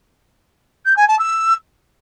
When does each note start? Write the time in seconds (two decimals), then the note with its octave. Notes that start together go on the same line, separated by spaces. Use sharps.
0.85 G6
0.96 G#5
1.08 A5
1.19 E6